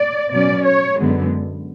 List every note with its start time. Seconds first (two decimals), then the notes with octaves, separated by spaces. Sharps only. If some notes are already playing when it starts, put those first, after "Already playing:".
Already playing: D5
0.31 B2 F#3 C#4 D5
0.65 C#5
0.98 F#2 D3 G#3 B3